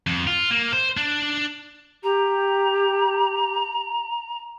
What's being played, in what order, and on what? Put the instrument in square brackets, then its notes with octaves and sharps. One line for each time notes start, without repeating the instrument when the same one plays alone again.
[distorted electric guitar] F2
F4
A#3
C5
D4
[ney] G4 [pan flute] A#5